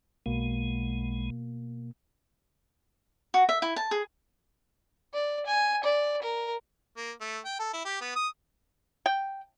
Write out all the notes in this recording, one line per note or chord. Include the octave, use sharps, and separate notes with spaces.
B1 B2 G#3 A#3
F#4
E5
E4
A5
G#4
D5
G#5
D5
A#4
A#3
A3
G5
A4
E4
G4
B3
D#6
G5